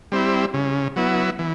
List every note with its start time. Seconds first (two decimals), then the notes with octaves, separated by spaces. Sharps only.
0.12 G3 C4 E4
0.54 C#3
0.96 F#3 B3 E4
1.39 E3